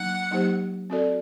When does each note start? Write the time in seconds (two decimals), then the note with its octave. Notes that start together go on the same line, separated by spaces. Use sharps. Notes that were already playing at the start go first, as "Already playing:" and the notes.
Already playing: F#3 A#3 D#4 F#5
0.31 F#3 A#3 D#4 G4 C5
0.90 C4 F#4 A4 D5